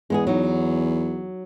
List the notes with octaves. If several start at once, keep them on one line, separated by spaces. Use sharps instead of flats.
E2 G#3 B3 G#4
F#3 D#4